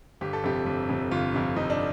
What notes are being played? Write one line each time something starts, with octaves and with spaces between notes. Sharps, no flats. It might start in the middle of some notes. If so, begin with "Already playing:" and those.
G1 G4
A4
F2 C3 G4
G1
F2 C3
G1 F4
F2 C3
G1 D#4
D4